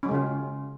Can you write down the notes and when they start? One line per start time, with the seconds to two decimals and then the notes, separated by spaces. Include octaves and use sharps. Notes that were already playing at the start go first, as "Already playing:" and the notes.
0.03 C#4
0.06 F#3
0.09 G#3
0.11 C#3
0.14 F4